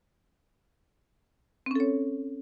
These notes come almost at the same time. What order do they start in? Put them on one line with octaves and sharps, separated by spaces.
C4 C#4 A4 C#5